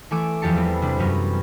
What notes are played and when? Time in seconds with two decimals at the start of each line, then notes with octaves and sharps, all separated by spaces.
0.10 E3 A3 G#5 D6 E6
0.42 E2 F3 G4 A5 C#7
0.56 G3 B3 C4
0.82 C3 G3 D4
0.99 F#2 C3 F#3 B3 C#4